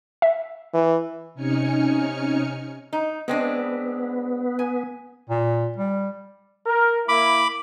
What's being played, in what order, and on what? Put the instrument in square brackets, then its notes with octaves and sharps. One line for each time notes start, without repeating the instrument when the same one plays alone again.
[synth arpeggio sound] E5
[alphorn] E3
[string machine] C3 C#4 D#4 G#5 F6 C#7
[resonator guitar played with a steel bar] D#4
[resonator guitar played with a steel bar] G#3 C4 D4 [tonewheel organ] B3
[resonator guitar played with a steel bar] G#5
[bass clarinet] A#2
G3
[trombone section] A#4
[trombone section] A#3 E4 [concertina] B5 D6